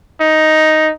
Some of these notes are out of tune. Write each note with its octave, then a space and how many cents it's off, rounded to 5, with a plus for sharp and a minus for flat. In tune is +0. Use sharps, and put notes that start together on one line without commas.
D#4 +5